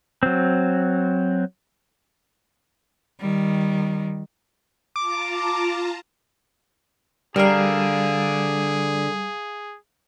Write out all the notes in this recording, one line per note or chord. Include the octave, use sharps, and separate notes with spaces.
F#3 C4
D#3 G3
F4 A5 A#5 D6
D3 G3 G#4 A#4 F5